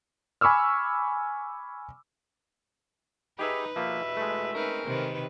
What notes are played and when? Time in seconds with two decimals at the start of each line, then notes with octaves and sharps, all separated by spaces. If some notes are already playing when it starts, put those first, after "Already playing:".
0.41 G#5 B5 C#6 D6 E6 F6
3.39 D#4 G4 G#4 B4 E5 B5
3.76 E2 G2 B2 F3 A#3 E5
4.17 G#3 A3
4.55 C4 C#4 D#4 A#4 B4
4.85 C3 D#3 B4